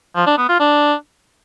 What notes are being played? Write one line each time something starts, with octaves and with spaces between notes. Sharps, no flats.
F3
D4
B3
F4
D4